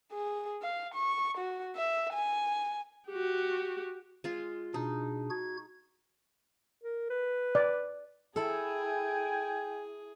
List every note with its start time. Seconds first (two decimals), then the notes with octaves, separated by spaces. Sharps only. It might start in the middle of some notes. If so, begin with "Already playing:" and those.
0.13 G#4
0.62 F5
0.94 C#6
1.38 F#4
1.76 E5
2.14 G#5
3.09 F#4 G4
4.24 G#3 F4
4.74 B2 D4 D#4 G#4
5.30 F#4 G#6
6.84 A#4
7.10 B4
7.55 D5
8.36 E4 G#4 A4 G5 G#5